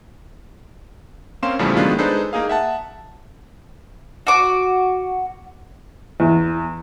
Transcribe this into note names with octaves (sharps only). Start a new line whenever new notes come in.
A#3 C4 C#4 F5 C6 E7
E2 A2 C#3 F3 G3 A3
D#3 F#3 G#3 B3 D4 F4
G#3 D4 D#4 A4 B4 C5
A#3 D#4 G#4 F5
E5 F#5 A5
F#4 D6
E2